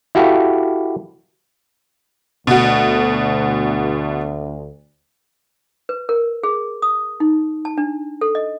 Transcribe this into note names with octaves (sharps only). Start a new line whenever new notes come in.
E4 F#4 G4 A4 F5
D2 B2 F#4
B4
A#4
G#4
D#6
D#4
A5
D4
A4
D#5